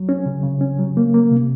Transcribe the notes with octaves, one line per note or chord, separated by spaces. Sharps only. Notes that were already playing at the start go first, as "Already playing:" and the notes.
Already playing: F#3
C#4
C#3
C#3
C#4
F#3
A#3
A#3
C3